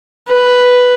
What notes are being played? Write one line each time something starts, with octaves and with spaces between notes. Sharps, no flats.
B4